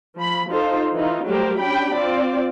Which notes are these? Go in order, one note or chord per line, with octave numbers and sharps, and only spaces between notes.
F3 B5
D#4 F4 A4 C5
E3 D#4 F4
F#3 G3 A3 G4 A#4 C5
C#4 D4 G4 G5 B5
C4 F4 D5